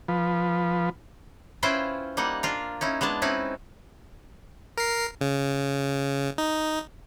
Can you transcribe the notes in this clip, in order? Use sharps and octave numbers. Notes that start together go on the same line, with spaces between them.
F3 B4
C#4 E4 F4 B4 C5 G5
G3 A#3 D#4 F#5
D4 F4 A#4
C#4 D#4 E4
G#3 B3 D4 A5
C4 C#4 D#4 E4 B4
A#4 C7
C#3
D#4